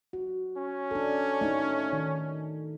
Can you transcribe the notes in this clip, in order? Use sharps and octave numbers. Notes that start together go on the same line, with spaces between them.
F#4
C#4
D4 A4
A3 D#4
D#3